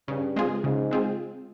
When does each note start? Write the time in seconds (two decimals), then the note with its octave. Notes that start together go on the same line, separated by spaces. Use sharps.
0.08 G2 C#3
0.36 G#3 C4 F4 G#4
0.64 G#2 C#3
0.91 G#3 C4 F4 G#4